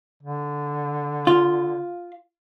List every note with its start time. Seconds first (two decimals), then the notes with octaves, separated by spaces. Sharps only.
0.23 D3
1.27 F4